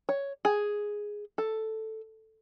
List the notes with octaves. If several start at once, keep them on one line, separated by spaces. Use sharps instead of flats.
C#5
G#4
A4